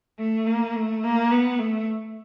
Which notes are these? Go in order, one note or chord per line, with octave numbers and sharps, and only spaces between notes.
A3
A#3
A3
A#3
B3
A3